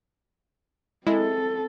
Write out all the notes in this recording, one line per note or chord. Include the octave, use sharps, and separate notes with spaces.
G#3 C4 E4 A4